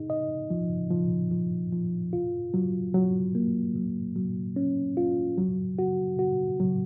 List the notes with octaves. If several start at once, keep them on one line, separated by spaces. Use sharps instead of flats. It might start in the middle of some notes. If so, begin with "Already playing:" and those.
Already playing: D#4 G#4
D#5
F3
F3
F3
F3
F4
F#3
F#3
A#3
F#3
F#3
C#4
F4
F#3
F#4
F#4
F#3